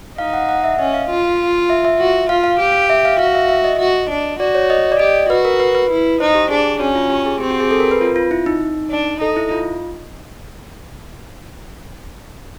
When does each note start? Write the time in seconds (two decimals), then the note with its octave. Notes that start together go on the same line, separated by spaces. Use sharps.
0.18 D#4 F5
0.34 F#5
0.49 F#5
0.64 E5
0.79 C#4 D#5
0.94 F5
1.10 F4
1.70 E5
1.85 E5
1.99 F#4
2.29 F4 F5
2.44 F5
2.59 G4
2.90 E5
3.05 F5
3.19 F#4 F5
3.35 E5
3.49 E5
3.64 D#5
3.79 F#4
4.10 D4
4.40 F#4 D5
4.55 C#5
4.70 D#5
4.92 D5
4.99 G4 D#5
5.30 F#4 B4
5.45 A#4
5.60 B4
5.75 B4
5.90 E4
6.20 D#4 C5
6.35 G4
6.51 D4 G#4
6.80 C#4 F#4
6.95 F4
7.10 G4
7.26 G#4
7.40 C4 G4
7.51 F#4
7.60 G#4
7.71 A4
7.80 A#4
7.91 B4
8.01 F4
8.16 F4
8.31 E4
8.46 D#4
8.90 D4
9.20 D#4 A4
9.36 E4
9.52 F4